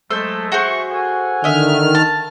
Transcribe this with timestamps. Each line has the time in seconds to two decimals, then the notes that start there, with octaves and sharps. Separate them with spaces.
0.11 F#3 G#3 A3 A4 C5 E6
0.52 F#4 G#4 C5 E5 C#6
0.91 A4 F#5 G#5
1.44 D3 D#3 D#5 E5 F6
1.95 A5